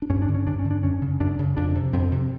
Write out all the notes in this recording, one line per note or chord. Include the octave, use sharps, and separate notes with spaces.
D4
G2 C#4
D4
D3
C#4
G2 D4
C#4
D3
D4
F#2 C#4
C#3
F#2 D4
C#3
F2 D4
C3
F2 C4
C3